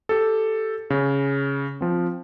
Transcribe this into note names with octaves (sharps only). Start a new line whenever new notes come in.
G4 A4
C#3
F3 C4